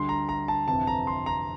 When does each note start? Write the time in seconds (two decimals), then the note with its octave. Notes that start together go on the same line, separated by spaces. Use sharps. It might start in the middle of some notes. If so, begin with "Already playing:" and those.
Already playing: D2 D3 G3 C6
0.09 A#5
0.29 A#5
0.48 A5
0.68 G1 F2 C3 E3 A5
0.87 A#5
1.07 C6
1.26 A#5